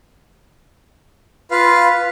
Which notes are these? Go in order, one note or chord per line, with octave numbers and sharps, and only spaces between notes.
F4 B4 F5